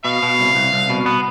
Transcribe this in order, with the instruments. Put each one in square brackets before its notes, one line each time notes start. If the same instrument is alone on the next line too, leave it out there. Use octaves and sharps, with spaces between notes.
[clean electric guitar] B2 [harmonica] F5
[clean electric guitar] B2
C2
C2
C2
B2
B3